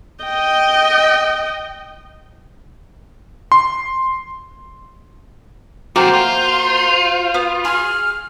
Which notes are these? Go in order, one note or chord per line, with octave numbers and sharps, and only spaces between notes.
D#5 G5
C6
A3 A#3 C4 F#4 C5
F4
B3
G#4 F6